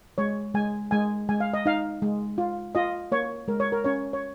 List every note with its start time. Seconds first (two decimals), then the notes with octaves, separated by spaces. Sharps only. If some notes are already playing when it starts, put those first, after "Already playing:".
0.18 G#3 C#5
0.54 G#3 G#5
0.91 G#3 G#5
1.29 G#3 G#5
1.40 F5
1.54 D#5
1.66 D#4 F5
2.02 G#3
2.38 F4
2.75 F4 D#5
3.12 A#3 C#5
3.48 G#3 A#4
3.60 C#5
3.72 A#4
3.84 C#4 C#5
4.13 C#5